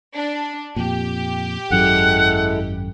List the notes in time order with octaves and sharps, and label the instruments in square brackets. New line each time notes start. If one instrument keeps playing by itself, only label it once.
[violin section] D4
[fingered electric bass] F2 A#2 [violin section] G4
[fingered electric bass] G#1 F#2 F#3 [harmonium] G#3 E4 A4 [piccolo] F#5